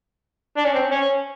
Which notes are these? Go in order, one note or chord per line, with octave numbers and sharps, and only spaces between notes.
D4
C#4
C4
C#4